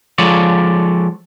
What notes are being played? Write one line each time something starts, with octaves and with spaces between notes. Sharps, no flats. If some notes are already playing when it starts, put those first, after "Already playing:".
F3 G#3 A4 C#5 D5